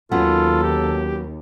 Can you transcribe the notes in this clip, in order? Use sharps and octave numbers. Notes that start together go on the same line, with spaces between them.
D#2 F#3 B3 C#4 F4 A4
G4